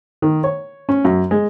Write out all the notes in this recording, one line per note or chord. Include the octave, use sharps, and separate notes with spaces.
D#3
C#5
C#4
F#2
G#3